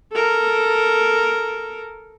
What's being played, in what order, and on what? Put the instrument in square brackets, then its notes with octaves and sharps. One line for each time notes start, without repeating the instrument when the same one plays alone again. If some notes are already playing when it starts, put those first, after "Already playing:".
[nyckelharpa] A4 A#4